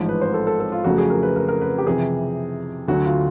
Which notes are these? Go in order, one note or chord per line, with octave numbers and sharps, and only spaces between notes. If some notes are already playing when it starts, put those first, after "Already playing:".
Already playing: A1 G#2 F3
B4
C5
A4
A4
A4
F4
F2 C#3 F#3 A3 F#4
G#4
A#4
B4
A#4
A#4
B4
G4
F2 C3 E3 G#4
D2 D3 F#3 F#4
F4